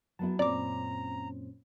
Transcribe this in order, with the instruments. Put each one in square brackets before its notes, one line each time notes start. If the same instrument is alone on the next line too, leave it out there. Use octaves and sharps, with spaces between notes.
[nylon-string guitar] F#3 B3 E4 [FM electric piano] A5
[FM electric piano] F#2 A#2 C#4 [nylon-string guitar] C4 [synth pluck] D5 D6 [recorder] A#5